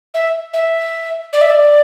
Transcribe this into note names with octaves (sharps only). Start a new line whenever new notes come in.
E5
E5
D5
E5
D5